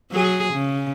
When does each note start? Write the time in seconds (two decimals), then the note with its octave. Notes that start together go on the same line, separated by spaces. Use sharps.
0.11 F#3 G#4
0.53 C#3